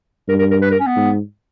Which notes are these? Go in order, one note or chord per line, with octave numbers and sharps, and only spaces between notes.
G2 A#4
A#4
A#4
B4
A#4
C#4
B3
G#2